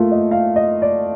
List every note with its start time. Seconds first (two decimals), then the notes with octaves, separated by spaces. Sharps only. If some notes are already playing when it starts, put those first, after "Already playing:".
Already playing: A3 A#3 F4
0.11 D#5
0.31 F5
0.56 D#5
0.82 D5